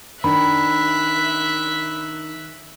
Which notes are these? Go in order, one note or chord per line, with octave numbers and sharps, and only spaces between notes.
D#3 D4 E5 B5 F#6